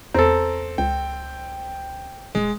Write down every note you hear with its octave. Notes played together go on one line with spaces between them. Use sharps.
E2 C4 A4 A#5
C#2 G5
D#1 G#3